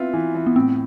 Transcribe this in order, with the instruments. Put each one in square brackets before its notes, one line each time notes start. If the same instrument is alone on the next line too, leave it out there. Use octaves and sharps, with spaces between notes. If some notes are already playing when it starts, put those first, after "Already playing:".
Already playing: [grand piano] B3 E4 F4 [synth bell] C4
[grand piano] E3
E3
[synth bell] B3
[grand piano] A2 [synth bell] C4